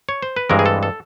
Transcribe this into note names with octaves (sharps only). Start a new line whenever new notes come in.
C#5
C5
B4
G2 E3 G#3 C4 A#4
G#4
A4
A4